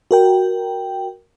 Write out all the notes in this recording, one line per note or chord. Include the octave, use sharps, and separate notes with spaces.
F#4 A#4 G5